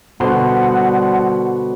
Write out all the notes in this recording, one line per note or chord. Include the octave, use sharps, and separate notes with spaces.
B2 D3 G3 F#4 C5 F#5 C6